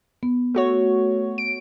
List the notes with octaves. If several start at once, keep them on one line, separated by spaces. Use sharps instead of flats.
B3
A3 F#4 C#5
D7